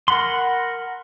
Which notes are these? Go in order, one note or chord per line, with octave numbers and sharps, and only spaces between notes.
A#4 F#5 B5 C6